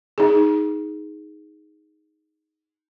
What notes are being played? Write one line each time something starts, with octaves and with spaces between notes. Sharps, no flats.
D#4 G#4